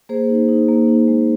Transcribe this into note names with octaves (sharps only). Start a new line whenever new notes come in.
A#3 G#4 C5
D#4
D#4
A#3
D#4
G#3